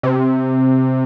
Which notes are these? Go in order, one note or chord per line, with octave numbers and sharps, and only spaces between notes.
C3